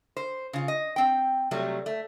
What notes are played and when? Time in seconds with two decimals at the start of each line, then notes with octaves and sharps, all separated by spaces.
0.17 C5
0.53 C#3 F4
0.68 D#5
0.96 C4 G5
1.51 C3 F#3 G3 A3
1.86 A3